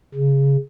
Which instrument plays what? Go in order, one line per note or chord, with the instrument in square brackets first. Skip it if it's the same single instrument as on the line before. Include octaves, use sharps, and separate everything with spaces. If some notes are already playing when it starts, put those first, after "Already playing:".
[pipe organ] C#3